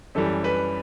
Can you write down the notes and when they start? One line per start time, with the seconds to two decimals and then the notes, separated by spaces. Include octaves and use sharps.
0.15 F#2 E3 G3 A4
0.44 B4